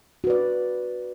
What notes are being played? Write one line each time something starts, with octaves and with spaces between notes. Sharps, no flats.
F#4 B4 D5